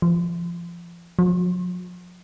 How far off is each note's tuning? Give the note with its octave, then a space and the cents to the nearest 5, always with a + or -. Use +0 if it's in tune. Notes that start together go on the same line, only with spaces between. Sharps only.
F3 -25
F3 +45